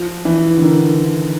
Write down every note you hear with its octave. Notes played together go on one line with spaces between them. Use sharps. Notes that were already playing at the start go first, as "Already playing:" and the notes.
Already playing: F3
E3
D3
D#3